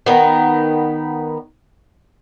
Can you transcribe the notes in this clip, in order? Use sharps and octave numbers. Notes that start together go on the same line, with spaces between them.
D#3 B3 D#4